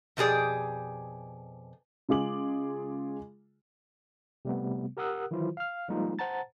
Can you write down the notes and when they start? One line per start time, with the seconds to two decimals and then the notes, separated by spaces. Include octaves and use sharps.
0.17 F2 B2 G4 G#4 D5
2.09 C#3 G#3 F4 G#4 D6 F#7
4.45 C3 G3 A3 B3
4.97 G4 A#4 F#5 D#6 E6 F#6
5.31 D#3 E3 F#3 E4 F4 C5
5.57 F5 F6
5.88 F3 G3 G#3 A#3 D#4 F4
6.19 C5 F#5 A5 A#5 A6